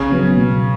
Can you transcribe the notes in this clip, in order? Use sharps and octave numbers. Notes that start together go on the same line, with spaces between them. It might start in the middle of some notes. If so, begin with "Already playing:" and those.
Already playing: C#3 C#4
F#3 B3
B2